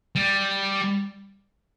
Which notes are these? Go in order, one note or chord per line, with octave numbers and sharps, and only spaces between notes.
G3